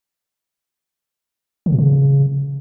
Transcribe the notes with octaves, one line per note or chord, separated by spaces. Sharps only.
D3
A#2
C#3